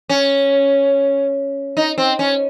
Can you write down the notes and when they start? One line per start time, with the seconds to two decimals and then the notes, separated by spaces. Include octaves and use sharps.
0.09 C#4
1.77 D#4
1.98 C4
2.19 C#4